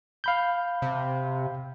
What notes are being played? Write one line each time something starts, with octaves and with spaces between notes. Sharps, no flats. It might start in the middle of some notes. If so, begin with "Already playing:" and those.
F5 B5 G6
C3